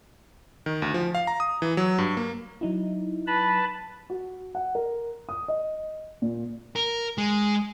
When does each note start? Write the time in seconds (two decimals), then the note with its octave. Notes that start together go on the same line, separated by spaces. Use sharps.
0.66 D#3
0.82 D2
0.94 F3
1.15 F5
1.27 A#5
1.40 D#6
1.62 E3
1.77 F#3
1.98 G2
2.17 A#3
2.61 F#3 D#4 E4
3.27 B4 A5 B5
4.10 F#4
4.55 F#5
4.75 A#4
5.29 D#6
5.48 D#5
6.22 A#2
6.76 A#4
7.18 G#3